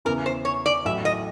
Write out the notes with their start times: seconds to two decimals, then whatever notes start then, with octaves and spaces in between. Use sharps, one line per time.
0.05 E2 C#3 E3 A#4
0.26 C5
0.45 C#5
0.66 D5
0.85 A1 A2 F#3 E5
1.05 D#5